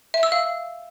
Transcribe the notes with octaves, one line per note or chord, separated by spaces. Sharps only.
E5
E6
F5